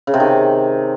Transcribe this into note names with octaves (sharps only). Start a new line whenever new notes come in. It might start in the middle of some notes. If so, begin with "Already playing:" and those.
C#3
C3
D#3